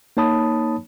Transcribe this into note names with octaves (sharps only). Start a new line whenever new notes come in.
A#3 D#4 C#5 A5 B5 D#6